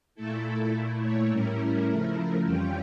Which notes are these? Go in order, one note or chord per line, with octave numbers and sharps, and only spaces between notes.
A#2 A3 E4 A4
A4
A#2 A3 E4
C#5
A2 G3 C#4 E4 A#4
C#3 F3 A3 E4 A#4
F2 E3 G3 C#4 F4 G5